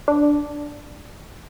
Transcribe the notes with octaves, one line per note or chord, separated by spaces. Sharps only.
D4